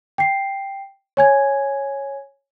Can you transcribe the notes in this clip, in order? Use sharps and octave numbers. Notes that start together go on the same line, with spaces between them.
G5 C7
C#5 G#5 G#6